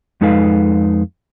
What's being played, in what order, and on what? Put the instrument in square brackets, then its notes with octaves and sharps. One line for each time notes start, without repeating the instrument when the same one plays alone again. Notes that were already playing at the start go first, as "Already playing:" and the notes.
[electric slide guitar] F2 G#3 D#4 A4 B4 F5